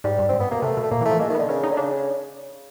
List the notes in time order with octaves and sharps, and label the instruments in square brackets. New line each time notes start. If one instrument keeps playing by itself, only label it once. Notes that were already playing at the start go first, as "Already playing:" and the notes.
[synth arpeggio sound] G#2 [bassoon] G3
[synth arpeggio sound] G2
[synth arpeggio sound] G#2 [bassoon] C4
[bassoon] B3
[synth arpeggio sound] B2 [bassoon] A#3
[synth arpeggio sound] C3 [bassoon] A3
[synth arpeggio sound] B2
[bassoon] A3
[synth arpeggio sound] A#2 [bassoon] A#3
[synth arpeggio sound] E3 [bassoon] A3
[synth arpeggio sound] F3
[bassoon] G#3 [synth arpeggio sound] A#3
[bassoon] D#3
[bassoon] D3 [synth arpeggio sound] B3
[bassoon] C#3 [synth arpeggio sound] C#4
[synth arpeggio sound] D#4
[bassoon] D3
[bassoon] C#3 [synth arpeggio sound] D4